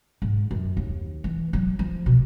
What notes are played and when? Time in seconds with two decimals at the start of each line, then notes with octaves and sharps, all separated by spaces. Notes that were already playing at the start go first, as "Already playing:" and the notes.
0.22 G#2
0.51 F#2
0.77 D#2
1.24 E3
1.53 F#3
1.79 F3
2.06 B2